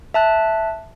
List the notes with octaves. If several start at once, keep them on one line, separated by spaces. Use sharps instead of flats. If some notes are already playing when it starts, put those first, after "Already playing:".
E5 A5 F#6